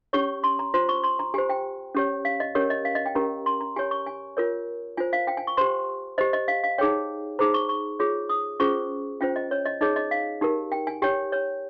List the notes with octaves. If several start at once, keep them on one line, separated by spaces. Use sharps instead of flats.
C#4 G4 C#5 C#6
C6
A#5
F4 C5 C6
C#6
C6
A#5
G4 C5 G#5
G5
C#4 G4 C#5
F5
D#5
C#4 G4 A#4 C#5
D#5
F5
D#5
G5
C#4 G4 A#4 A#5
C6
A#5
G4 C#5 G#5
C#6
G#5
F4 A#4 C#5
F4 C5 G#5
F5
G5
G#5
C#6
G4 C5 C6
G4 C5 D#5
D#5
F5
F5
D#4 G#4 C#5 G5
D#4 G#4 C5 A#5
C#6
C#6
F4 G#4 C#5
D#6
C#4 F4 G#4 C5 C#6
C#4 F4 C5 G5
D#5
C#5
D#5
D#4 G#4 C#5 D#5
D#5
F5
D#4 G4 A#4
G5
G#5
G4 C#5 G5
C#5